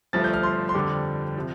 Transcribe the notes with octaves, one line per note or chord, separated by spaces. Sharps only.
G1 G2 F3 A3 A6
G6
F6
C6
C6
F2 D3 G3 D6
C3 F3